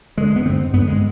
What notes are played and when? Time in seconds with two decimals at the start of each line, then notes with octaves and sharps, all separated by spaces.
0.17 G2 D3 G#3
0.36 B3
0.45 G2 D3 C4
0.73 G2 D3 B3
0.87 G#3